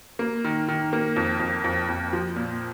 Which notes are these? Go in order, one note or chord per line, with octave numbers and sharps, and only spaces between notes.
A#3
D#3
D#3
A#3
F2
F2
F2
F2
F3
A#2